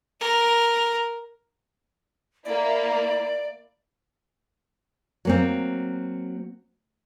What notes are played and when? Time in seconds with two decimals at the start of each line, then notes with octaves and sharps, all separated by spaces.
0.20 A#4
2.45 A#3 E4 D5
5.25 F#3 A#3 C4